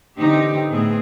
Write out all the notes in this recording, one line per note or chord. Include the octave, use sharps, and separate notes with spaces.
D3 E3 C4 D#4 G4
A2 B3 C4 G#4